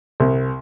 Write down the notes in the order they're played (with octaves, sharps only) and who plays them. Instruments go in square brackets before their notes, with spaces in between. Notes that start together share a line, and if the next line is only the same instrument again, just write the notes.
[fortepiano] C2